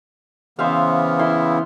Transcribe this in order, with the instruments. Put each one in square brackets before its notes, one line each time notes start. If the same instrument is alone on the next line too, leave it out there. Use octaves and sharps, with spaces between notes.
[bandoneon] C#3 E3 B3 [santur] C5 E5 F5
[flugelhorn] E4 [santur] C6